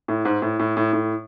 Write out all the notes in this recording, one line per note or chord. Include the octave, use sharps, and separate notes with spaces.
A2
G#2
A2
A2
A2
A2